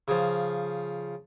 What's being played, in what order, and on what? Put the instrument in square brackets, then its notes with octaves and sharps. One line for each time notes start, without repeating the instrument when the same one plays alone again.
[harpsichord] C#3 F3